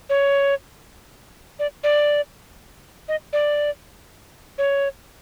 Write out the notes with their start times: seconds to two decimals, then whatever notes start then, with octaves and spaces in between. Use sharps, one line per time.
0.10 C#5
1.59 D5
1.84 D5
3.08 D#5
3.33 D5
4.58 C#5